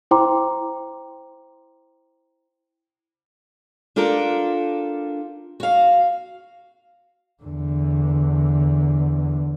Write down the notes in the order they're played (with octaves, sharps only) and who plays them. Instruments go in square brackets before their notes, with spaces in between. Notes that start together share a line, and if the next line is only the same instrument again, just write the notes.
[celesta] E4 C5 G5 A#5 C6 D6
[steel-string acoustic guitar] D4 F4 G4 A4 A#4
F#4 F5
[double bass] E2 D3